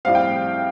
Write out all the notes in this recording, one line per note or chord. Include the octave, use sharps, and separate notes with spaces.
A2 G3 C4 F5
G5